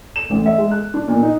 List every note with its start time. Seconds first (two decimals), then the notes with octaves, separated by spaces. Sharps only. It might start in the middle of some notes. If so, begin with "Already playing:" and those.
0.16 E7
0.30 A1
0.46 E5
0.58 G#3
0.71 F#6
0.94 D4
1.08 A#2
1.22 D#4